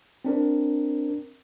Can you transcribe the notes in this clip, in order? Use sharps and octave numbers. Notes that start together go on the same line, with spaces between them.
C4 D4 A#4